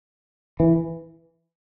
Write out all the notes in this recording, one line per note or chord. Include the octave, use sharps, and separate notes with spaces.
E3